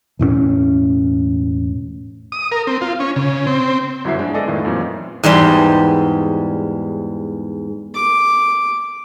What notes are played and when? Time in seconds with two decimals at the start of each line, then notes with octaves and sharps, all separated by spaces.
0.19 E1 A2 A3 C#4
2.32 D#6
2.52 A#4
2.67 C4
2.81 F4
3.00 C#4
3.16 C#3
3.47 C4
4.04 G1 F#2 E4 F#4 E5 C7
4.18 F3 G#3 D4
4.34 B3 G#4 A4 D5 D#5
4.47 F2 A2 D#3 A3 F4
4.65 F#2 A#2 E3 C4
5.23 E2 G#2 G3 C6
7.95 D6